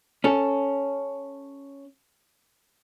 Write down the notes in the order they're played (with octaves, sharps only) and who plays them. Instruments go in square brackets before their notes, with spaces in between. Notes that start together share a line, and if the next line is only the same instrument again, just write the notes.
[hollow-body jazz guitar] C#4 A4